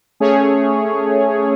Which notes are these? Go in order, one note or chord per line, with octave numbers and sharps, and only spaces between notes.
A3 C#4 G#4 C#5